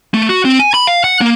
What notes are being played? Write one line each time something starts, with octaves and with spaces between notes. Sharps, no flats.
A3
F#4
C4
G#5
B5
F5
F#5
A#3